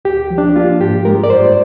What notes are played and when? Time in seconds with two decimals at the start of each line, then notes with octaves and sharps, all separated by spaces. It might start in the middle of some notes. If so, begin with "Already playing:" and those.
0.05 D2 G4
0.31 F3
0.38 D4
0.56 A#3 F4
0.80 G#2 G4
1.05 G#3 A#4
1.24 D5
1.30 G2 C5